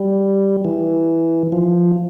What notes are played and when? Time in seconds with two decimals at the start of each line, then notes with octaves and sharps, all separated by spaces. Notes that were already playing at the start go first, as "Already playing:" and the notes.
Already playing: G3
0.65 E3
1.52 F3